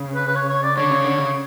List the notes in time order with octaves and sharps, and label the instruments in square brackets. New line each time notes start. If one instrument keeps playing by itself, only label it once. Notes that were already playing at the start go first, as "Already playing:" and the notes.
Already playing: [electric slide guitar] C#3
[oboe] B4
B4
C#5
C#5
D5
[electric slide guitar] D3 [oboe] C#5
[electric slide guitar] C#3
D3
C#3